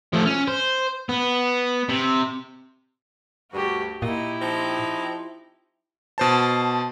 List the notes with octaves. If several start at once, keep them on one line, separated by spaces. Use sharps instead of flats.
F3 A3
C#4
C5
B3
C3
D2 G2 F#4 G4
A#2 D#4 E4 G4 D#5
F3 C4 D#4
B2 C5 A5